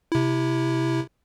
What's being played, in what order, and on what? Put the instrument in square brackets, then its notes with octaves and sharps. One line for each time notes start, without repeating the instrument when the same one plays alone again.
[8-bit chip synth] C3 E4